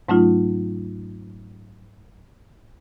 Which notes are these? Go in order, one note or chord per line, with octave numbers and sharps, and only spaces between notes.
G#2 F#3 A3 C#4 D#4 F4